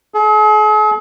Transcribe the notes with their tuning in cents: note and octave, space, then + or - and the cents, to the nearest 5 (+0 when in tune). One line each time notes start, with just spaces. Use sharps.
G#4 +45